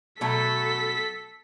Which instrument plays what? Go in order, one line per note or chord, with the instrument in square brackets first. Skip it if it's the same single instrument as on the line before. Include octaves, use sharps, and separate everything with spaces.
[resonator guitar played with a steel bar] B2 F#3 A3 [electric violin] A4 B6